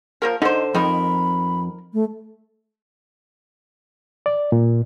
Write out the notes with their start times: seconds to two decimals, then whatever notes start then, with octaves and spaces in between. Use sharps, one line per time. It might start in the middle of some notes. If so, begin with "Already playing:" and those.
0.22 F3 A#3 A#4
0.42 D3 D#4 C5
0.75 F2 D#3 D#4 A#4 B5
1.93 A3
4.26 D5
4.52 A#2